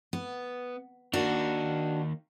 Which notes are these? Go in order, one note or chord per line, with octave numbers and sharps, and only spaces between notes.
B3
D#3 A#3 D4 F#4